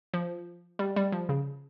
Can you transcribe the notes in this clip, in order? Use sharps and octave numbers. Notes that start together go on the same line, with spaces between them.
F3
G3
G3
F3
C#3